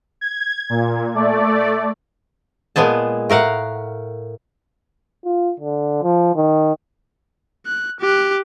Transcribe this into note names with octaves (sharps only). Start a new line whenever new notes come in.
G#6
A#2
A3 D5
A#2 G#3 B3 G#4 A5
A2 A#4 F5 F#5
F4
D3
F3
D#3
F#6
G4 F#6